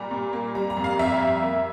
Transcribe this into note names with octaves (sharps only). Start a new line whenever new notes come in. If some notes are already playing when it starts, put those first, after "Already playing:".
Already playing: A#2 G3 A#5
A#2
A#3
G3 A#5
A#5
F2
F5
F2 E5
F2
A#3